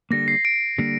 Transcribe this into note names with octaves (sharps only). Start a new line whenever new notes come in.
D3 G3 A#3 A#6
C7
D7
D3 G3 A#3